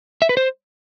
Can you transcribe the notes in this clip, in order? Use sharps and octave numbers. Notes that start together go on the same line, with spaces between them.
E5
B4
C5